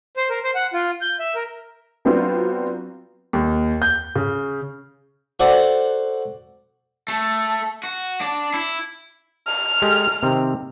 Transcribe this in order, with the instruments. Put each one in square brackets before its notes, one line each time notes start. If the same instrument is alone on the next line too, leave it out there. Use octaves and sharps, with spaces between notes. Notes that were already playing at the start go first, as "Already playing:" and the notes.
[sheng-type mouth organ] C5
A#4
C5
F#5
F4
G6
E5
A#4
[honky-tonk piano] F#3 B3 C4 D4 F4 F#4
[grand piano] D#2
G6
C#3
[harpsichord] F#4 A4 C5 D5 F#5
[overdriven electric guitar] A3
F#4
D4
E4
[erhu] F6
[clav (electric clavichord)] G#3 G4 A4
C3 D#3 C4